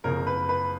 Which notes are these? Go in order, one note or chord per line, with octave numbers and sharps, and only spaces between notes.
F#1 F2 C#3 A#4
B4
B4